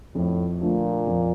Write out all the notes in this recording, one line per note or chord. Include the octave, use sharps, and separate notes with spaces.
F2 A2
A#2 D3 F3 A3
F2